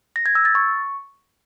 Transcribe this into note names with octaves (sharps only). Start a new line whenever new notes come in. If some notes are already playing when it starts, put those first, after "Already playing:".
A#6
G#6
E6
A6
C#6